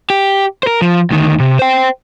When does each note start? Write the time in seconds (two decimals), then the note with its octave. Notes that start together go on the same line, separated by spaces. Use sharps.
0.10 G4
0.63 A#4 C5
0.82 F3
1.11 D2 D#3
1.40 C3
1.59 C5 G5